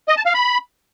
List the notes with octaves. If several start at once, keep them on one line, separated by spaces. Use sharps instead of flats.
D#5
A5
F5
B5